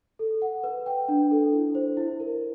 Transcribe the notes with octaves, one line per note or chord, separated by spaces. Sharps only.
A4
F#5
B4
G5
D4
A4
E4
C5
E4
A#4